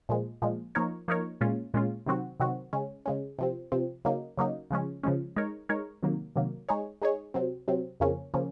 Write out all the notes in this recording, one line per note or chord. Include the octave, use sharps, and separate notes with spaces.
A#2 F3 G#3
A#2 F3 G#3
F3 A#3 D#4 A#4 C#5
F3 A#3 D#4 A#4 C#5
A#2 G#3 C#4 F4
A#2 G#3 C#4 F4
C3 D#3 F#3 C4 F#4
C3 D#3 F#3 C4 F#4
C#3 G#3 C#4
C#3 G#3 C#4
C3 F3 C4
C3 F3 C4
C#3 F#3 A#3 D#4
C#3 F#3 A#3 D#4
C#3 F3 G#3 C#4
C#3 F3 G#3 C#4
G#3 D#4 A#4 C#5
G#3 D#4 A#4 C#5
C3 D#3 F#3 A#3
C3 D#3 F#3 A#3
G#3 D#4 G#4 C#5
G#3 D#4 G#4 C#5
C3 F#3 C4
C3 F#3 C4
F2 C#3 F3 A#3 C#4
C#3 F3 A#3 C#4